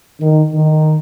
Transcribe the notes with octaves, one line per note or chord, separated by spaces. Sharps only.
D#3
D#3